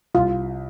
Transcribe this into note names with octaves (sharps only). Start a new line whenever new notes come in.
C2 F4